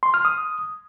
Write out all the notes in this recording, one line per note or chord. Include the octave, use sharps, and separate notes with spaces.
C6
F6
D#6